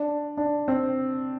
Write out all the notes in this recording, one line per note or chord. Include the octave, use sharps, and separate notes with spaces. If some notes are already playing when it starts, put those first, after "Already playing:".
Already playing: D4
D4
C4